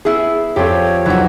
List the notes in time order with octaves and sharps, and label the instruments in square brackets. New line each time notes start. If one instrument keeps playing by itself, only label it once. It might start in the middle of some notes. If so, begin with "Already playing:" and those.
[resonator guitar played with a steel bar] B3 E4 G#4
[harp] F2 D5 F5 [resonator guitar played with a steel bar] C4 G4 [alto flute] C#5
[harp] B1 E2 [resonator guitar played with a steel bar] E3 F#4